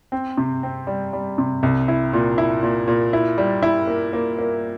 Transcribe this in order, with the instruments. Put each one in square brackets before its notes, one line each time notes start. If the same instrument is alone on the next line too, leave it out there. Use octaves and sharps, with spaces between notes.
[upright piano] C4
C3
C4
G3
G3
C3
C2
E4
A#2
E4
A#2
A#2
E4
G3
E4
A#3
A#3
A#3